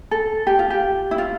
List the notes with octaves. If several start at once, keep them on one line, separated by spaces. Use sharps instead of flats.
A4
G4
F4
G4
E4
F4